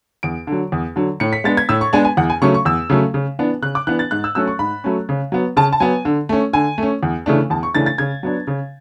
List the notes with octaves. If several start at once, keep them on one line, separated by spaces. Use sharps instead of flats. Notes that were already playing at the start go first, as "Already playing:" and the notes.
E2 D7
D3
F#3
E2
D3 F#3
A2 C#7
B6
G#3 B3 D4 A6
G#6
A2 E6
C#6
G#3 B3 D4 G#5
G#5
E2 F#5
G#5
C#3 F#3 A3 C#4 C#6
C#6
E2 E6
C#3 F#3 A3 C#4
C#3
E3 B3 D4
C#3 F#6
D6
E3 B3 D4 F#6
A6
G#2 F#6
E6
F#3 A3 C#4 E6
C#6
G#2 B5
F#3 A3 C#4
C#3
F#3 B3
C#3 A5
A5
F#3 B3 G#5
D3
A3 C#4
D3 G#5
A3 C#4
E2
C#3 E3 A3 D4
E2 A5
C#6
C#3 E3 A3 D4 A6
A6
C#3 G#6
F#3 B3 D4
C#3